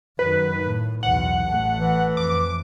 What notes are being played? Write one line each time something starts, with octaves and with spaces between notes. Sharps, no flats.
F#2 D#3 B4
A2
B1 E2 F#5
A1 A3
E3
F2 D6